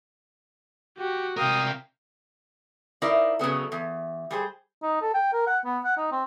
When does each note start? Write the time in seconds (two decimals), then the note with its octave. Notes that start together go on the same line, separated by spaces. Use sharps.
0.98 F#4 G4
1.37 C3 A#4 F5 G5 D#6
3.02 D#4 E4 A#4 C5 D5
3.39 C#3 F#3 B3 A4
3.72 E2
4.31 G3 G#4 C5
4.82 D#4
5.01 A4
5.14 G5
5.33 A#4
5.47 F#5
5.65 B3
5.84 F#5
5.97 D#4
6.12 C4